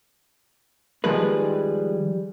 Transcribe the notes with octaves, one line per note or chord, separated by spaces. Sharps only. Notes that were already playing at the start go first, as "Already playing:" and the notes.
D#3 F3 G3 G#3 G#4 B4